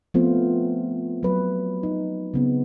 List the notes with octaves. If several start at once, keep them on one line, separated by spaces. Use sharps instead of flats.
F3 A3 B3 C4 F4 C5
F#3 B4
D#4
C#3 B3 C4